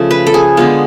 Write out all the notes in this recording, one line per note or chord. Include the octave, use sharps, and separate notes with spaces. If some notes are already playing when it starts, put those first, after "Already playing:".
Already playing: C#3 F3 A3 A4
B4
A4
G#4
D3 G#3 B3 F4